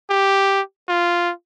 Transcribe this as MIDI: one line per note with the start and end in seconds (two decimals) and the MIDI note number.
0.10 0.61 67
0.89 1.32 65